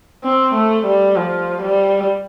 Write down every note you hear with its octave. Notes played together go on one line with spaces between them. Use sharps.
C4
A3
G3
F3
G3